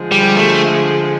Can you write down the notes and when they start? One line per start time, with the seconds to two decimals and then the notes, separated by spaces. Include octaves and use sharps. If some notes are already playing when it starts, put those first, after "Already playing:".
Already playing: D3 F3 G#3
0.12 G3
0.36 A3